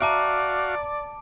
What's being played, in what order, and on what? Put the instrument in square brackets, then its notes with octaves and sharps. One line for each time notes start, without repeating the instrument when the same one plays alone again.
[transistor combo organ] F#4 F5 [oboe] D5 [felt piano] E5 A#5 [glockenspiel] A5 D6 D7